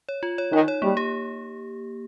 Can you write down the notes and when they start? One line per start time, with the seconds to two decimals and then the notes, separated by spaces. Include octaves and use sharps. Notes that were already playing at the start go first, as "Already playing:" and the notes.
0.09 C#5
0.23 F4
0.38 C#5
0.52 D#3 D#4
0.68 C#5
0.82 G3 A#3
0.97 G4